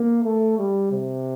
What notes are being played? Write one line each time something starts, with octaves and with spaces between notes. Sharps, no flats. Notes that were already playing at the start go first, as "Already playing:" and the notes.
Already playing: A#3
A3
G3
C3